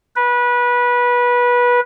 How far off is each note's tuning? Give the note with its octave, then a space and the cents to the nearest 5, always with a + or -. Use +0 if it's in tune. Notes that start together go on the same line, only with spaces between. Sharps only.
B4 -20